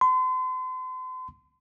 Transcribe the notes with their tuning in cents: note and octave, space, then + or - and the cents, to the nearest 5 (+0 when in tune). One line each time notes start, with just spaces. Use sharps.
C6 -40